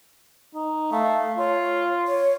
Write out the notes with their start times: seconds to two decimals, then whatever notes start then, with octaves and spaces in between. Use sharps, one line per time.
0.55 D#4
0.92 A3 F5
1.38 F4 C#5
2.07 C#5